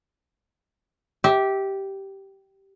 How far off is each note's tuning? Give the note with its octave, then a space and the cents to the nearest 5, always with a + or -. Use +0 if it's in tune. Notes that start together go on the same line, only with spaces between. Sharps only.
G4 -10 E5 -25